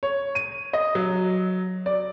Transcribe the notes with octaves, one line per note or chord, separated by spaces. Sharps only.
C#5
D#7
D#5
F#3
D5